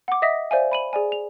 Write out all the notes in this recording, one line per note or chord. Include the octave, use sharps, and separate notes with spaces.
F#5 D6
D#5 E5 D#6 A#6 B6
C5 D5 E5 F5 G#5
B5 D#7 F#7
G#4 D5 G#5
F7